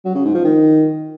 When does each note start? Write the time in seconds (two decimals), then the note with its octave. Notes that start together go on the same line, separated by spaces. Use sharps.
0.05 F#3
0.15 C#3
0.25 G#2
0.34 F3
0.44 D#3